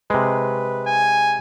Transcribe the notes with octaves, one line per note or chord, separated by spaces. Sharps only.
C3 G#3 B4
G#5